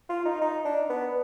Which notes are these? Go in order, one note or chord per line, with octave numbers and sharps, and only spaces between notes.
F4
D#4
D#4
D4
B3